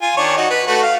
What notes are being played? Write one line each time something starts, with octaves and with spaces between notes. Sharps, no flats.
F4 G#5
D#3 D4 C#5
D#4 F#4
B4
A3 F#4 B4
F5